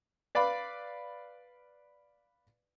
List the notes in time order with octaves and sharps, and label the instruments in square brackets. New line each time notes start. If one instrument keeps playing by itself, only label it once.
[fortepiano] B4 D5 F5 B5